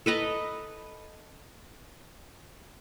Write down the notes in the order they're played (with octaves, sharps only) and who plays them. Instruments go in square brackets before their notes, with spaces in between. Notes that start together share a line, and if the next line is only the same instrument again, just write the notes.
[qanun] A4 B4 D#5 A#5